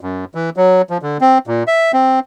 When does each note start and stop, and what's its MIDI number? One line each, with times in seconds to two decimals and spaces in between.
0.01 0.25 42
0.35 0.50 52
0.57 0.82 54
0.90 0.98 53
1.02 1.17 50
1.21 1.38 60
1.47 1.63 46
1.67 1.92 76
1.93 2.19 60